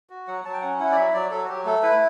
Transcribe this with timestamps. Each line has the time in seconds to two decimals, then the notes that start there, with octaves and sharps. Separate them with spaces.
0.10 F#4
0.27 F#3 F#5
0.45 F#3 A5
0.53 G5
0.62 C#4 F#5
0.80 E4 F#5
0.92 D5
0.96 F#3 E5
1.13 F#3 D5
1.31 F#3 A4
1.44 F#4
1.49 F#3 G4
1.65 A3 A4
1.83 E4 B4